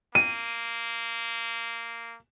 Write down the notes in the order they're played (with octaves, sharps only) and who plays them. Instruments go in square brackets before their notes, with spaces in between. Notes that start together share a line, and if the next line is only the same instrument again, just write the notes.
[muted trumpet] A#3 [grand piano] D#7